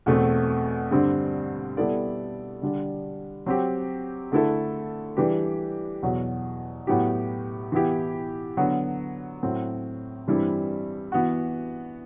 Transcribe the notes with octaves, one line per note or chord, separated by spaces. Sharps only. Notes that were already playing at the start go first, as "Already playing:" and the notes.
E2 B2 A3 C4
G2 D3 G3 C4
G3 B3 E4 A4 D5
D3 G3 D4
F#3 C4 G4
D3 A3 E4 A4
E3 G3 D4 G4 B4
E2 B2 F#3
A2 F#3 B3 E4 G4
E3 B3 E4 G4
D3 F#3 B3 F#4
A2 F#3 C4
G2 E3 G3 C4 E4
E3 B3 F#4